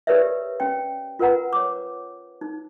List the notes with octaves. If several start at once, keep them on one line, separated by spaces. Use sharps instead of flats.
G4 A#4 B4 C#5 D5 E5
C#4 G5
F4 A#4 B4 F#5 A#5
C#5 D6
D#4